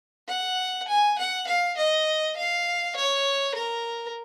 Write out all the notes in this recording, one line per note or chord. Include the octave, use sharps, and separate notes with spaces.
F#5
G#5
F#5
F5
D#5
F5
C#5
A#4